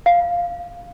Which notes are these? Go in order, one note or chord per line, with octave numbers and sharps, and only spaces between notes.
F5